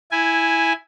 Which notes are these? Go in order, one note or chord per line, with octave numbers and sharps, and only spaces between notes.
E4 G#5